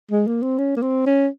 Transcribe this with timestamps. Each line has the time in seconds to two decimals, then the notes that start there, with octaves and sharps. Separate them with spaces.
0.11 G#3
0.27 A#3
0.42 C4
0.58 C#4
0.77 A#3
0.82 C4
1.06 C#4